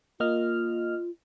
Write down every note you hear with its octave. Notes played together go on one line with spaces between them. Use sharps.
A#3 F4 D#5 F6